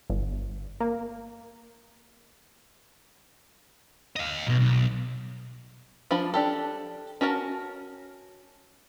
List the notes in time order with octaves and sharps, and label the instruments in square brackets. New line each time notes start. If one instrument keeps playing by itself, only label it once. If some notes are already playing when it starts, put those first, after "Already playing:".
[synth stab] G1
A#3
[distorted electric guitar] D#5 F5
B1 B2
B1
[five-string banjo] F3 D4 C5 B5
D4 G4 A4
C#4 F#4 A#4 A5